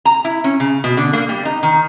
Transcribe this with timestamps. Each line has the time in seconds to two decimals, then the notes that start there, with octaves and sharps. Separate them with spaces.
0.05 A#5
0.25 E4
0.44 C#4
0.60 C#3
0.84 B2
0.97 D3
1.13 A#3
1.29 G3
1.45 D#4
1.63 D#3